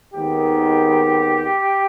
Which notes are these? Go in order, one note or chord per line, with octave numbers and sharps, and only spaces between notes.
D#2 D#3 G#3 B3 G4